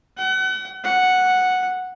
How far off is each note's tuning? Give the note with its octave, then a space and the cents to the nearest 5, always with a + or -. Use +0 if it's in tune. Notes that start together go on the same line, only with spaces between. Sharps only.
F#5 +40
F#5 -5